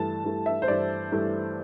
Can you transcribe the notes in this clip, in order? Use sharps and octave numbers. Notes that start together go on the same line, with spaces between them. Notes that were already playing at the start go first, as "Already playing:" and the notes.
Already playing: G2 E3 A3 A5
G2 E3 A3
E5
C5
G2 E3 A3 D5
G2 E3 A3